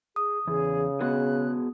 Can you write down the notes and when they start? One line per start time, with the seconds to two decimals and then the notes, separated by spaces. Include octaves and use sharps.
0.16 G#4 D#6
0.47 E2 C#3 G#4
1.00 B3 F#4 G#4 F#6